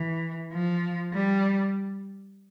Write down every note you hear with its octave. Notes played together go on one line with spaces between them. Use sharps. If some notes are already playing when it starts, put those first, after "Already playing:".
Already playing: E3
F3
G3